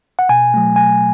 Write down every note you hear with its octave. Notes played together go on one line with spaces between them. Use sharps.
F#5
B2 G#5
F#3 A3
B2 G#5